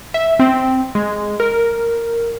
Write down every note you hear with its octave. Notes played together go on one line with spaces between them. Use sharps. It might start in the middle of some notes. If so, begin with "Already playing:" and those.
E5
C4
G#3
A#4